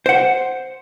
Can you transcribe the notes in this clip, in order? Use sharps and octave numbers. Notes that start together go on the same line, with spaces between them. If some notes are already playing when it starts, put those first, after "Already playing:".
C5 F#5